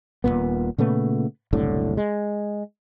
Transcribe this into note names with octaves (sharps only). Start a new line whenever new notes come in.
D#1 F2 A#2 B3
A#2 C#3 A3 B3
F#1 C2 A2 D3
G#3